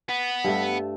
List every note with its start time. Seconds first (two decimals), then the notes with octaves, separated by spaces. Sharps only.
0.09 B3
0.44 G2 A3